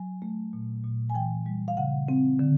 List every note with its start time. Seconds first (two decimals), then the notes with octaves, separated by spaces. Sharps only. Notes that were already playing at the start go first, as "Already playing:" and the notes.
Already playing: F#3 G#5
0.22 A3
0.53 A#2
0.84 A#2
1.10 G#5
1.15 E3 G5
1.46 G3
1.68 F5
1.77 C#3 F#5
2.08 C4
2.39 D3